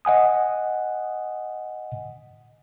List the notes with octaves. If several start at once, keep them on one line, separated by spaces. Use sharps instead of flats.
D#5 F#5 G#5 D#6